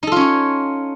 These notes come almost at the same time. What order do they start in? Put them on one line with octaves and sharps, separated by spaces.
D#4 A4 F4 C#4 C#5